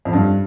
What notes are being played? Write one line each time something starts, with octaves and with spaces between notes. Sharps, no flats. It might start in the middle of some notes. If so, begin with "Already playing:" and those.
F2
G2